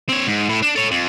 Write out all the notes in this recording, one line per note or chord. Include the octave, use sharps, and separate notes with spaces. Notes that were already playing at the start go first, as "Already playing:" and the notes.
C4 C#5
G#2
A2
D4
A4 C#5
F2